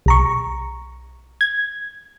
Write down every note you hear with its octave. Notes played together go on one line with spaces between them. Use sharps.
B1 A#5 C#6
G#6